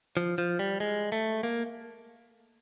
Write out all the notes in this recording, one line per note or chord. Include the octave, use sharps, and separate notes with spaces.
F3
F3
G3
G#3
A3
A#3